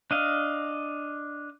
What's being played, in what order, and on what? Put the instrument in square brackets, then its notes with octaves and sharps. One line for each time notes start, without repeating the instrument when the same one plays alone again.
[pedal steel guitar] D4 D#5 F5